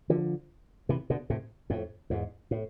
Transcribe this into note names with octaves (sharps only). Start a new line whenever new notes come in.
D3 F3
C3 E3
B2 D3
A2 C3
F2 A2
E2 G#2
A2